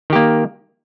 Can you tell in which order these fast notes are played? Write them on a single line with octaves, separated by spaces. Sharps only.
D#3 G4 A#3